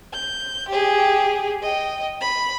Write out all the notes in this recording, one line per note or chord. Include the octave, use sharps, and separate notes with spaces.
G6
G4 G#4
D#5 G5
B5